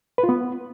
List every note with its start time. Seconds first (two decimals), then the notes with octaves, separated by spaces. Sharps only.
0.18 B4
0.24 F4
0.29 B3